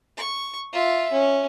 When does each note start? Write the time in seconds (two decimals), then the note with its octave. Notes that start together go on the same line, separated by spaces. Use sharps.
0.17 C#6
0.73 F4 E5
1.12 C#4